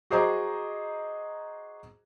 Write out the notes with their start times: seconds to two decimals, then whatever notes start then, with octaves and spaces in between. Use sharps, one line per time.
0.10 F#4 G#4 C5 D#5 A#5 D6